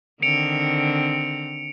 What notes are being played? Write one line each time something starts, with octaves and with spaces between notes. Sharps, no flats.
D3 D#3 C4 C#7 D7 F7